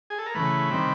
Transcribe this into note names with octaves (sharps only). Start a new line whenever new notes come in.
G#4
A4
A#4
C#3 E3 A3 B4
C3 D#3 G3 C4